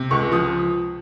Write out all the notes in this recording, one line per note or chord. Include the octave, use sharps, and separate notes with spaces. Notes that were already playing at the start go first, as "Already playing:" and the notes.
Already playing: C3
C#2 C#6
F3 D#6